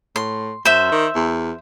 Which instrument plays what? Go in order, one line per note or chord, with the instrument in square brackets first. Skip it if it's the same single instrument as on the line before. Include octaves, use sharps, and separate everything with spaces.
[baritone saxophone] A2 [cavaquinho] C6
[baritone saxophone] F#2 [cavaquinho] C5 E5
[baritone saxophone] D#3
E2